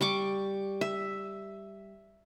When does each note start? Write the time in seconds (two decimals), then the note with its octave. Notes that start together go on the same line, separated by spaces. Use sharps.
0.01 G3 C#6 D6
0.81 E5